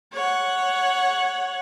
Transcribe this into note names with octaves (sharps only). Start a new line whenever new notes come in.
C#5 F#5